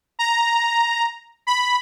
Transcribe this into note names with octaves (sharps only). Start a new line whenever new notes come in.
A#5
B5